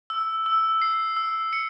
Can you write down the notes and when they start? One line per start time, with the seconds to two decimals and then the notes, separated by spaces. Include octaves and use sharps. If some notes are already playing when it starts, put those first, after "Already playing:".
0.10 E6
0.46 E6
0.82 C7
1.17 E6
1.53 C#7